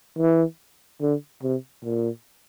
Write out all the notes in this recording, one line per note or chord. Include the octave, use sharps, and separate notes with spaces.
E3
D3
C3
A#2